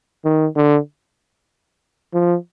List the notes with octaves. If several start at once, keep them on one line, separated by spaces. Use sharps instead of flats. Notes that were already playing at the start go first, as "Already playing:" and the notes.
D#3
D3
F3